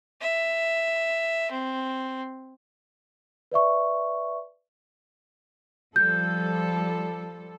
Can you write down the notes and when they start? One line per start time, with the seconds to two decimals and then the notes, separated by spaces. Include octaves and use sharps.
0.22 E5
1.51 C4
3.52 B4 D5 E5 C#6
5.96 F3 G3 A4 G6